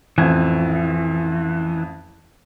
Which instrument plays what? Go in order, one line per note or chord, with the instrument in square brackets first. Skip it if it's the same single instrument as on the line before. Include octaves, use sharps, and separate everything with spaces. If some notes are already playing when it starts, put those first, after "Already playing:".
[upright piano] A1 F2 G#6 [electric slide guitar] E3